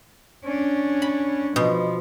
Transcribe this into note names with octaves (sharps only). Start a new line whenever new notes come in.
C#4 D4
B5
B2 F3